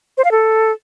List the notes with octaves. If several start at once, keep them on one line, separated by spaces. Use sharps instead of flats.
C5
F5
A4